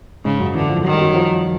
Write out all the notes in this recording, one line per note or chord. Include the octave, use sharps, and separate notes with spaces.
G#2 C#3 G#3
F#2 F#3
D3 E3
F3
D#3 F#3
G3
F#2 F#3
F3